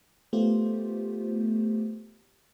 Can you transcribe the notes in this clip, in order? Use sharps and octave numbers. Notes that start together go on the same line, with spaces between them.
A3 B3 F4 G4 C5